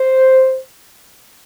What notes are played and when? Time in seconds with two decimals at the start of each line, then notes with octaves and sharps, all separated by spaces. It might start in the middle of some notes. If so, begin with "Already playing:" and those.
Already playing: C5